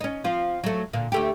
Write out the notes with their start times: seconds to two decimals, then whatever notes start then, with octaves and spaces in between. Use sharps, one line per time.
0.01 C#4 D#4
0.24 F3 C4 F4
0.64 F#3 A3
0.93 A#2 D3
1.12 D2 A3 G4